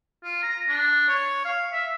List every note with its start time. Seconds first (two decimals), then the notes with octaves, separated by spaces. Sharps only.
0.24 F4
0.43 A#5
0.69 D4
1.09 C#5
1.45 F5
1.72 E5